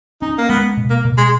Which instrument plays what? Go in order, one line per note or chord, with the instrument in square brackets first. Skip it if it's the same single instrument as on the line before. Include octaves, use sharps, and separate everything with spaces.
[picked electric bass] C#4 [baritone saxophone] D#4
[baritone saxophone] A#3
[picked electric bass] G#3 [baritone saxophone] B3
[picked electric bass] B2
[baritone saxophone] A#3
[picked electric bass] B2
[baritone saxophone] G#3